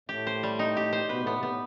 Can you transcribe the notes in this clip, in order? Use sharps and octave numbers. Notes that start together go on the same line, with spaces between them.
A2 A3 G4
C5
G3
D#4
G4
C5
B2 B3 B4
A2 A3 B3
C3
A2 B3